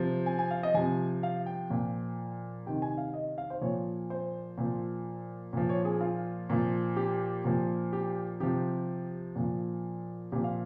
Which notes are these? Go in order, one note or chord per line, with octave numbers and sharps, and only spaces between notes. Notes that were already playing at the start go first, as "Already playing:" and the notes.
Already playing: C3 F3
G#5
G#5
F5
D#5
C3 F3 G#5
F5
G5
A#2 F3
C3 D#3 G5
G#5
F5
D#5
F5
C5
A#2 F3 C#5
C5
A#2 F3
A#2 F3
C#5
G#4
F4
A#2 F3
G4
A#2 F3
G4
C3 F3 G4
A#2 F3
A#2 F3 G4
F5